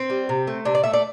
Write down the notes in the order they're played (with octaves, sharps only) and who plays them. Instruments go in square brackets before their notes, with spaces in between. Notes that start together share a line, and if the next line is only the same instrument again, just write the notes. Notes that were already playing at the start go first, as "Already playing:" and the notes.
Already playing: [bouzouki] C4
G3
C3
A3
C3 D4
D5
A3 E5
D5